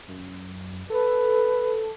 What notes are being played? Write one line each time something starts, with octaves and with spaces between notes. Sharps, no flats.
F#2
A4 B4